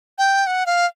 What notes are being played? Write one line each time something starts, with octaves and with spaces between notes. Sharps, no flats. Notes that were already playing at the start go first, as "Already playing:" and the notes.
G5
F#5
F5